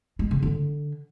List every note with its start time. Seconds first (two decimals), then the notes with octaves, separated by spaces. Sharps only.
0.19 G#3
0.31 C#3
0.43 D3